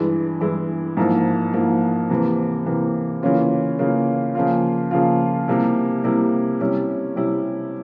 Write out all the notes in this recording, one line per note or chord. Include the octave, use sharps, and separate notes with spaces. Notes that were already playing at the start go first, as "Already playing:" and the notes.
Already playing: G2 E3 G#3 E4
G2 E3 G#3 E4
G#2 F3 A#3 E4
G#2 F3 A#3 E4
C3 E3 A#3
C3 E3 A#3
C#3 E3 A#3 C#4 F4
C#3 E3 A#3 C#4 F4
C#3 F3 A#3 F4
C#3 F3 A#3 F4
C3 G3 A#3 E4
C3 G3 A#3 E4
C3 G3 C#4 E4
C3 G3 C#4 E4